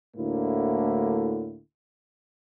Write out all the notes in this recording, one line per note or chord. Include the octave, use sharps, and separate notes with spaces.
D2 A2 D3 A#3 E4